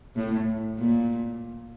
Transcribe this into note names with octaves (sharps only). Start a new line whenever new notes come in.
A2
A#2